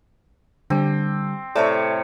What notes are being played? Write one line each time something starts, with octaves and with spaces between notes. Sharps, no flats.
D3 G3 C4
A2 C3 A4 C#5 D5